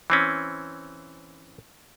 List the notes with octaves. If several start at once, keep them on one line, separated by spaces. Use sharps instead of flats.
E3 C4 C#4